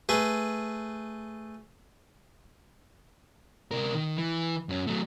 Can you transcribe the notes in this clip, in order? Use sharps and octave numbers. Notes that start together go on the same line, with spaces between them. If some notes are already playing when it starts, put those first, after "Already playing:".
A3 G#4 B4
C3 A#4
D#3
E3
F#2 C#4
F#3 A3